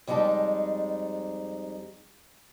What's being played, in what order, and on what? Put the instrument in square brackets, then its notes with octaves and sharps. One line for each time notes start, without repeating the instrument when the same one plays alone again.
[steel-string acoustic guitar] F2 G3 G#3 D#4 A5